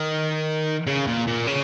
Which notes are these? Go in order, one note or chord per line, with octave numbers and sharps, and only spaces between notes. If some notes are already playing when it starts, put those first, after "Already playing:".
Already playing: D#3
C#3
A#2
A#2
C#3